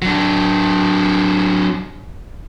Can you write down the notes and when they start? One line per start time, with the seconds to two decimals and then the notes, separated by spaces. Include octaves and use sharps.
0.02 F#3 D4